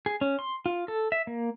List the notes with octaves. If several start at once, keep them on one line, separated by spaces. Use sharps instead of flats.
G#4
C#4
C6
F4
A4
E5
A#3